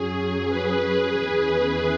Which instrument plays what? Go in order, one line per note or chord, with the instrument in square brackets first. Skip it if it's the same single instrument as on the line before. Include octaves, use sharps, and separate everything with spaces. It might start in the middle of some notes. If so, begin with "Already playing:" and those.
Already playing: [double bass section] F#2 F#3 C#4 [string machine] G#4
[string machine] B4
[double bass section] E2 E3 C#4